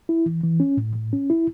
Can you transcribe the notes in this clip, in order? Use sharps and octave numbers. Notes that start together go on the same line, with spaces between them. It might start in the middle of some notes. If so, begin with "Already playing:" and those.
E4
E3
E3
C#4
A2
A2
C#4
E4